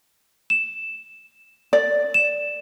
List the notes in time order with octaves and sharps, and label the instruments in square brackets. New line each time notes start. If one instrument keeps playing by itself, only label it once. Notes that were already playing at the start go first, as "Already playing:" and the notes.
[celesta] E7
[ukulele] D5
[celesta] E7